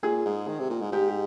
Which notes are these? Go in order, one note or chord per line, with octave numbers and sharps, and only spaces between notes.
A#2 G#4
G#2
D#3
C3
A#2
G#2
G#2 G4
G4